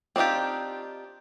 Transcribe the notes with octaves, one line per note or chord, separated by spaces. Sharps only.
C4 D4 D#4 F4 G4